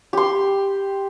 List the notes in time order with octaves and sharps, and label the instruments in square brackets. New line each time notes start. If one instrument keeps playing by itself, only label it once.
[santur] G4 C6